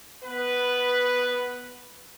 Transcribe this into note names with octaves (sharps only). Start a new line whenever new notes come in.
B3 B4